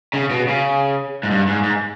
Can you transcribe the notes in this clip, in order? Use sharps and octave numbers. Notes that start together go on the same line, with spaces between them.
C#3
B2
C#3
G#2
G2
G#2
G#2